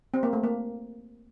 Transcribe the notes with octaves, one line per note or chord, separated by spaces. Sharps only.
C4
A#3
A3
A#3